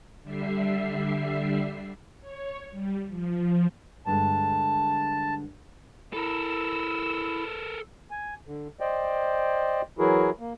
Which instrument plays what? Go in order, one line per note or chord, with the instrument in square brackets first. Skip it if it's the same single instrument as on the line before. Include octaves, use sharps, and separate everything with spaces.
[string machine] D3 G3 E5 C7
C#5
G3
F3
[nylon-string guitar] G2 D3 G#3 [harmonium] A5
[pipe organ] E4 B5 [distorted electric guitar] A4 A#4 [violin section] E6
[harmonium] G#5
D3
C5 D5 D#5 G5
E3 F#3 E4 F#4 G#4 A#4
A#3